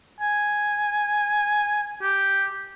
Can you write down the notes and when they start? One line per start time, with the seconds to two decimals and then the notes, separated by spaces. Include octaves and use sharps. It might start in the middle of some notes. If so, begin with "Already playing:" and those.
0.21 G#5
2.02 G4